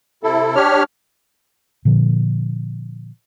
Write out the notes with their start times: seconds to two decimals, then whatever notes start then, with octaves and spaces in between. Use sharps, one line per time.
0.23 C3 E4 A4
0.55 D4 G4 C#5 F6
1.85 A#2 D3 F3